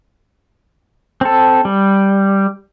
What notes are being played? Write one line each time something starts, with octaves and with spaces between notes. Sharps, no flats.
C4 A4
G3